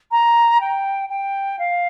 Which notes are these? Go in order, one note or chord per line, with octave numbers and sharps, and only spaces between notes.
A#5
G5
G5
F5